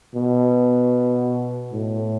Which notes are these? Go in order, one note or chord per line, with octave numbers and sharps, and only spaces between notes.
B2
A2